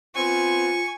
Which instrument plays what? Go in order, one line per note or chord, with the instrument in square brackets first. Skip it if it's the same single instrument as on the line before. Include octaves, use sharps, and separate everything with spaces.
[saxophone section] B3 C4 [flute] F4 [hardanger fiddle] G#5 [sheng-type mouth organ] C#6